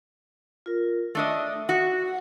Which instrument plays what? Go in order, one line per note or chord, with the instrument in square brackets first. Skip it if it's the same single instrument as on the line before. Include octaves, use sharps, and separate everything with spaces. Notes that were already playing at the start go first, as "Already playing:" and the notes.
[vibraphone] F4 A#4
[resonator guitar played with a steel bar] A3 D4 D#5 [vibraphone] E5
[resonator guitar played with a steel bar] F#4